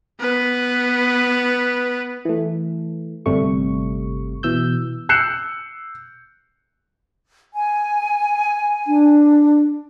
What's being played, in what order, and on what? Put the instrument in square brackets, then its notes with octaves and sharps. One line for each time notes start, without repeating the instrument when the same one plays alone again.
[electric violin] B3 B4
[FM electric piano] E3 A3
G1 C3 G3 A3 C#6
B2 E3 E6 G6
[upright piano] E6 F#6 G6 C7 C#7 E7
[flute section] G#5
[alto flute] D4